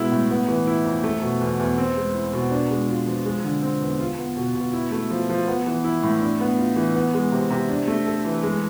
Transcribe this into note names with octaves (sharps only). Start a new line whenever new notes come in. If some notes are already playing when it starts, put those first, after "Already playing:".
Already playing: B2 G#3 B3 E4
A2
B3
E3
E4
F2
A3
B2
E2
E2
C4
G#3
E4
B2
D4
G#3
F4
F3
G#3
D3
C4
E2
F4
B3
B2
B2
E4
A3
F3
F3
B3
E3
E4
A2
D4
B3
F4
E3
B3
G#3
C3
C3
D4
A3
A4
E3
G#3